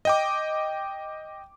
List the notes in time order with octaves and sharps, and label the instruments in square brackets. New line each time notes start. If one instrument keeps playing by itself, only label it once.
[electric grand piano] D#5 G5 D6